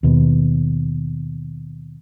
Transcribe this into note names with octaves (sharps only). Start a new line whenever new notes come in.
D#2 B2